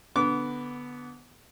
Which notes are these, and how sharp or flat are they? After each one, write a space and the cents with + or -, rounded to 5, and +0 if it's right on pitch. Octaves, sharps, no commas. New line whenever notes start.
D3 +0 B3 +0 D6 -30